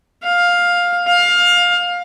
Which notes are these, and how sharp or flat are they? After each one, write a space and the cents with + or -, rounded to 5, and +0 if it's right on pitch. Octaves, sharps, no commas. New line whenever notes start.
F5 +10
F5 +20